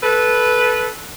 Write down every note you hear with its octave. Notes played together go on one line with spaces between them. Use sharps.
A4 B4